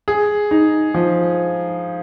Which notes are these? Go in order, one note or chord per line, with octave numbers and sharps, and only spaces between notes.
G#4
D#4
F3